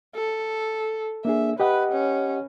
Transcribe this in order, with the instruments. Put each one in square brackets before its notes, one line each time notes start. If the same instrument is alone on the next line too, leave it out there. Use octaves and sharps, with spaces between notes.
[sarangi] A4
[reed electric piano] A#3 D4 G#4 [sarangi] E5
[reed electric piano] G4 D#5 F#5 [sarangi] B4
[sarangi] C#4